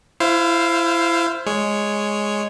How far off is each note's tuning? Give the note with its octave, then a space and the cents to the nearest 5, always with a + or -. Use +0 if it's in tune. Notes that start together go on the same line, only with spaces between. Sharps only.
E4 +30 C5 +0 F5 +0
G#3 +0 C#5 +0